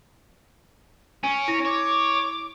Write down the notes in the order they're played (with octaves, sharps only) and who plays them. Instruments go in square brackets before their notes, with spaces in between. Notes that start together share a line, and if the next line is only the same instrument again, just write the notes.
[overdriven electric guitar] C#4 [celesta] G#5 [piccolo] D7
[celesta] E4 A#6
[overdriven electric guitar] C#5 [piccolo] D6